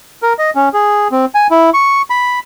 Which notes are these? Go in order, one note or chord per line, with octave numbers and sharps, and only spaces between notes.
A#4
D#5
C#4
G#4
C4
G#5
E4
C#6
B5